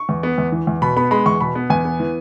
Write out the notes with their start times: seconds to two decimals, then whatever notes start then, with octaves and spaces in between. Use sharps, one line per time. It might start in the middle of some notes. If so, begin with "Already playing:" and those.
Already playing: C#6
0.09 E2
0.23 B3
0.38 E2
0.52 E3
0.67 E2
0.82 B2 B5
0.97 B3 B5
1.11 G#3 B5
1.26 E2 C#6
1.41 B2 B5
1.55 B3
1.70 E2 G#5
1.85 B3
2.00 E3